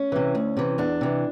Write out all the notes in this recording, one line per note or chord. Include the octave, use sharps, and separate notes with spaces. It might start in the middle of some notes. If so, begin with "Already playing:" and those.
Already playing: C#4
C3 E3
D2
C3 E3
E2 D4
C3 E3